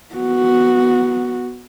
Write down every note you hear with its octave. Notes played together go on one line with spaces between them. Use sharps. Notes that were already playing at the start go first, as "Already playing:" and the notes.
B3 F#4